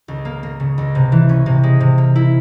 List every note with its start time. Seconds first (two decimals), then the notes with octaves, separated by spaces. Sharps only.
0.08 C#2
0.25 A#3
0.43 A#3
0.60 C#3
0.78 C#2
0.95 C3
1.12 E3
1.29 C#4
1.46 C3
1.63 G#3
1.80 C3
1.98 A#3
2.16 E4